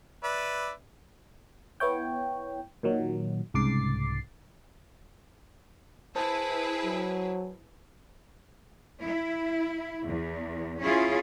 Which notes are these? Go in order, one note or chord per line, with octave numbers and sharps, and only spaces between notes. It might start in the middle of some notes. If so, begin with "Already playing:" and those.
B4 D5 E5
B3 E4 C#5 G5
A#2 D#3 F#3
C2 G#2 C#3 D6 A6 C7
E4 G#4 B4 C5 A5
F#3
E4
E2
C#4 E4 F4 G#4